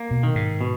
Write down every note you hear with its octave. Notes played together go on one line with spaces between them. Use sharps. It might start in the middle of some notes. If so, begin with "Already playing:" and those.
Already playing: A#3
B2
D#3
G#2
B2